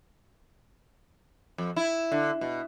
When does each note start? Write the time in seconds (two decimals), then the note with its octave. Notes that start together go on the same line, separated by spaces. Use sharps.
1.58 F2
1.76 E4
2.12 D3
2.41 B2